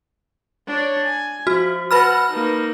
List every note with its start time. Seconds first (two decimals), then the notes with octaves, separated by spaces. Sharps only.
0.67 D4 C#5
1.05 G#5
1.47 F3 F#4
1.91 B4 F#5 B5 F6
2.30 A#3 D#4